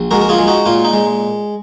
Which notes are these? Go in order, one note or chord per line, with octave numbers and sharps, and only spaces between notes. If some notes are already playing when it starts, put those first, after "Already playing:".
Already playing: A#1
G#3 F#4 A#4
A#4
F4 G#4
G#3
D#4 F#4
A#2 F4
D#4
G#3